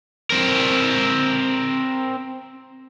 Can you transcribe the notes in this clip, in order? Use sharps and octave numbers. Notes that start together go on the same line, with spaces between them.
C4 A#4